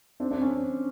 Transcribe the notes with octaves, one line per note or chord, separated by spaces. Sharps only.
C4 D4
C4 D4
C#4